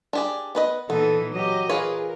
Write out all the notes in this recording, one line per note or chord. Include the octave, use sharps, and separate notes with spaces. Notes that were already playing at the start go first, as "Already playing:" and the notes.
D4 G4 G#4
B3 B4 D#5
A#2 E3 B3 D#4 A4
F#3 G4 D#5
F4 G#4 A#4 B4 C#5